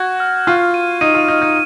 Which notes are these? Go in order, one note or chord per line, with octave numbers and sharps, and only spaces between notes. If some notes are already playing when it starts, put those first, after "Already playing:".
Already playing: F#4 G#6
F6
F4 C#6
D#7
D#4 D#7
F4
D#4 F6
D#4